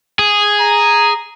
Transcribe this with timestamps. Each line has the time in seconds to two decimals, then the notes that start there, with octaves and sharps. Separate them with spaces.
0.19 G#4
0.60 A#5